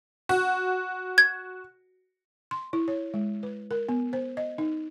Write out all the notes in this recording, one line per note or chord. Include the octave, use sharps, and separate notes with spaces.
F#4
G#6
C6
E4
C#5
G#3
B4
A#4
B3
C5
D#5
D#4